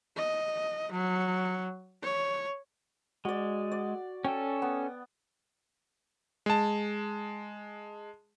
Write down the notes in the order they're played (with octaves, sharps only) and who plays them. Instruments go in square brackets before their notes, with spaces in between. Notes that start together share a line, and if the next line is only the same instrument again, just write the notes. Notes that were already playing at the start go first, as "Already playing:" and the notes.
[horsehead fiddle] D#5
F#3
C#5
[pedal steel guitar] G#3 [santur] F#4 D5
[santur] D5
[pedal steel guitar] C#4 A4 [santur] G5
[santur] B3
[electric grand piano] G#3 A5